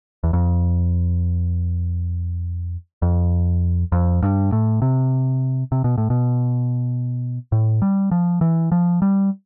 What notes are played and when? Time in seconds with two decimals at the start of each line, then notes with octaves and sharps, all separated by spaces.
0.24 E2
0.33 F2
3.02 F2
3.92 F2
4.23 G2
4.52 A2
4.82 C3
5.72 C3
5.84 B2
5.98 A2
6.10 B2
7.52 A2
7.82 G3
8.11 F3
8.41 E3
8.72 F3
9.02 G3